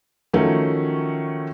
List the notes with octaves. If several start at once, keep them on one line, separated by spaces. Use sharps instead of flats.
D#3 F3 F#3 A3 C#4